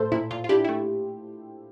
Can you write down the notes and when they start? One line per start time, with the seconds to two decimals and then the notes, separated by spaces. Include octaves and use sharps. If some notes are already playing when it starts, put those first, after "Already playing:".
Already playing: A2 A3 A4 C5
0.12 A#2 E4
0.31 A#2 F4
0.44 F4
0.49 D4 E4 G4
0.64 A3 E4